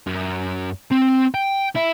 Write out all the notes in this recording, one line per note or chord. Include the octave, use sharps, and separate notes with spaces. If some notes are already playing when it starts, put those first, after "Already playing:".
F#2
C4
G5
E4